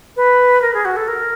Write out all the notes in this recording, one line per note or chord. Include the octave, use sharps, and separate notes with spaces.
B4
A#4
G#4
F#4
A4
A#4